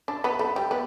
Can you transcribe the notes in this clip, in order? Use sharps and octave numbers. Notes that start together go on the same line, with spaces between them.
D4 A5
B3 B5
A3 B5
G3 G5
B3